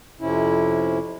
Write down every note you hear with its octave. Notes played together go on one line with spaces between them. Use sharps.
F2 C3 C#4 E4